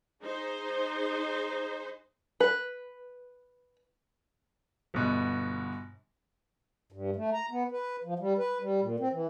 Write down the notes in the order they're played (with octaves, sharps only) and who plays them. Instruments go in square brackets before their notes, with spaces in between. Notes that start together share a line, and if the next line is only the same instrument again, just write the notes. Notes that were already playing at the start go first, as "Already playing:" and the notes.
[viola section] D#4 G#4 C5
[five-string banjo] B4
[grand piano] G1 B2
[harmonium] G2
A3
A#5
B3
B4
F3
G3
B4
G3
A#2
C4
E3